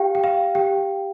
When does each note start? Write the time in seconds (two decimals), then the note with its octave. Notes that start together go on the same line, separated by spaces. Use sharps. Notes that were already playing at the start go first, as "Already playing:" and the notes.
Already playing: G4 F5 G5
0.15 G5
0.24 F5
0.55 G4 G5